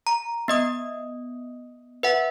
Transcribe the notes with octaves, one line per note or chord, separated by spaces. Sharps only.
A#5
B3 D#5 D#6
B4 E5 F#5